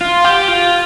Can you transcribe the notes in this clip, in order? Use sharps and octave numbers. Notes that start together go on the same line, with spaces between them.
F4
G4
F4